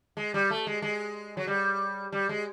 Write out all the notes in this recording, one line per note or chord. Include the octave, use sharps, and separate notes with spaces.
G#3
G3
A3
G#3
G#3
F#3
G3
G3
G#3